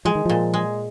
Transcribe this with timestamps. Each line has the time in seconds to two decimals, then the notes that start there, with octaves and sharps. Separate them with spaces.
0.05 F3 G#3
0.15 D#3
0.25 A#2 F3
0.54 G#3